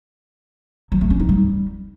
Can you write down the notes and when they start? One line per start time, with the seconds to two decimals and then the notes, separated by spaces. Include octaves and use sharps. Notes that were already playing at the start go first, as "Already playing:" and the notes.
0.92 F#3
1.01 A3
1.10 C#4
1.20 D#4
1.29 G3